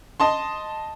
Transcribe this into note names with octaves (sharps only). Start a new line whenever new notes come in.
D#5 A5 C6